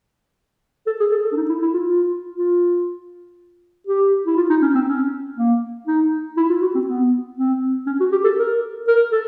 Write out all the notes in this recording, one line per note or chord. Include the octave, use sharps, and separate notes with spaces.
A4
G#4
A4
A4
D4
D#4
E4
E4
F4
F4
F4
G4
E4
F4
D#4
C#4
C4
C#4
A#3
D#4
E4
F4
F#4
C4
B3
C4
C#4
F#4
G4
A4
A#4
A#4
A4